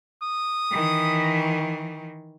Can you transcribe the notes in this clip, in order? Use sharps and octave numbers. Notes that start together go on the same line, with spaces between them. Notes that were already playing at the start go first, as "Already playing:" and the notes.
D#6
D#3 E3